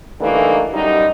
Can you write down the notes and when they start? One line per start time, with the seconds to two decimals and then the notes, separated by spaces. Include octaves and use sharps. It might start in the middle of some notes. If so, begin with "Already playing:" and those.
0.19 D3 E3 G3 A3 A#3 D#4
0.73 F#2 G3 D#4